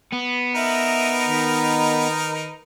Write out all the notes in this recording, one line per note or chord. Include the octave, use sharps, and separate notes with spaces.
B3
D#4 A#4 B4 E5
D#3